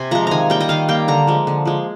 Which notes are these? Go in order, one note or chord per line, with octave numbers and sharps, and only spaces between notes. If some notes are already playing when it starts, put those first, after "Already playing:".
Already playing: C3 G#5 C6
F3 G#3 A#5
D#3 G#5 A#5
G3 A#3 G5
D#5
D#3 F5
G3 A#3 G5
D3 A#5
F3 G#3
D3
F3 G#3